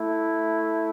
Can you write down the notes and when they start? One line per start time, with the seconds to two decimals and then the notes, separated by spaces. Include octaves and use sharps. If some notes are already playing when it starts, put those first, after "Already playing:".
Already playing: A3 E4